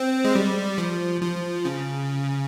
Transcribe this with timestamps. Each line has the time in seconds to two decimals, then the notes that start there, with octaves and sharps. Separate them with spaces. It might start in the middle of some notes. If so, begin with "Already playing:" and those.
Already playing: C4
0.25 G#3
0.35 G3
0.78 F3
1.22 F3
1.65 C#3